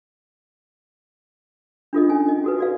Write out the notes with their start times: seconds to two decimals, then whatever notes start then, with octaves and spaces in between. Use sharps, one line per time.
1.93 D4 F4 A4 D#5
2.09 C#4 D#4 G#5
2.29 D#5
2.44 F#4 A4 B4
2.58 F#4 D5 F5